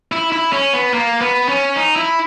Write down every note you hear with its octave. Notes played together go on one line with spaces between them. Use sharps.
E4
E4
C#4
B3
A#3
B3
C#4
D#4
E4